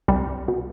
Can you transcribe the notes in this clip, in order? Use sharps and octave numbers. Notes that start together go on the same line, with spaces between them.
C2 G3
B2